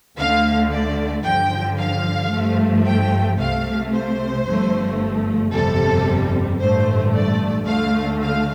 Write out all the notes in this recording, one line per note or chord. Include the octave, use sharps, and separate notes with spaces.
D2 D3 A3 F5
D5
G2 D3 F3 G5
F5
G2 F3 A3
G5
C2 C3 A3 F5
C5
G1 G2 F3 A3
G1 F2 C3 G3 A4
A1 G2 D3 A3 C5
D5
D2 D3 A3 F5
F5